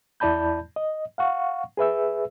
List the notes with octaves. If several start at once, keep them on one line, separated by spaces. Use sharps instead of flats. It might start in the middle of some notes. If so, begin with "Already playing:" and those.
E2 E4 D5 A5 B5 G6
D#5
F5 F#5 C#6
G#4 B4 E5 E6